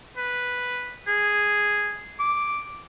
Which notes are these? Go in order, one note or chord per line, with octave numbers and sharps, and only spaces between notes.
B4
G#4
D6